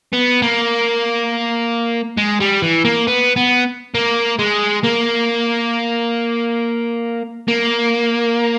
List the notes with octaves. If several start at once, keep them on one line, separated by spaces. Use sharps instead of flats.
B3
A#3
G#3
G3
E3
A#3
B3
B3
A#3
G#3
A#3
A#3